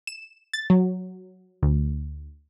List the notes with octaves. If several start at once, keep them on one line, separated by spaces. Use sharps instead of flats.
E7
A6
F#3
D2